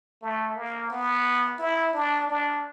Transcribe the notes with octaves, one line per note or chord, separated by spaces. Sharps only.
A3
A#3
B3
E4
D4
D4